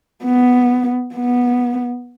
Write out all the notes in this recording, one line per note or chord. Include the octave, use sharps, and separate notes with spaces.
B3
B3